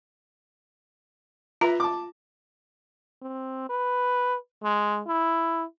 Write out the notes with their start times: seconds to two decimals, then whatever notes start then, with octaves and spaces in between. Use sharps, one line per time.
1.61 F4 B4 E5 A#5
1.80 A5 D6
3.22 C4
3.69 B4
4.64 G#3
5.07 E4